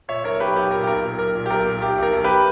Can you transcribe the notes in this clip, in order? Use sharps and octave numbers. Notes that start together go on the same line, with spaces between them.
A#2 C#5 E5
B1 A#4 C#5
B1 G4 B4
B1 G4
A#2 A#4
G4
B1 A#4
A#2
B1 A#4
A#2
G4
B1 A#4
A#2
B1 G4
B1 A#4
B1
G4 B4